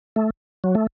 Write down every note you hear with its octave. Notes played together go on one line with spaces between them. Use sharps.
A3
F#3
A3